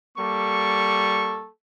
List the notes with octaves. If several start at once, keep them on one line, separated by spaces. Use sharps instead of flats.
G3 A#3 A4 C#6